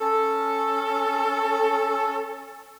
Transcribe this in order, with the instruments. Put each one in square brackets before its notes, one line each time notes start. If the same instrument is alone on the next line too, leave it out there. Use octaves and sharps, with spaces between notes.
[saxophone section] C#4 A4